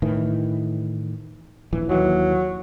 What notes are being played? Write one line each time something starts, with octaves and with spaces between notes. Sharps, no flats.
A2 D#3 E3
D#1 A#1 E3
D#2 E3 F#3